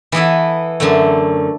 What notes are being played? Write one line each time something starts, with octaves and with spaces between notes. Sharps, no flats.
E3 B3 E4 A4
F#2 D3 A3